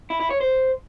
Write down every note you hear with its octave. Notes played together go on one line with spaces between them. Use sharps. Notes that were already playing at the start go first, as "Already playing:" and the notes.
E4
E4
C#5
C5